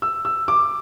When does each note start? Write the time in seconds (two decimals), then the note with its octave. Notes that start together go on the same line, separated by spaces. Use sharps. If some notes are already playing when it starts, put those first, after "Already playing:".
0.02 E6
0.25 E6
0.48 D6